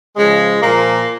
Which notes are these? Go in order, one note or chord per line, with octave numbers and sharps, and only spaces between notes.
C#3 F3 G#3
A#2 F3 A#3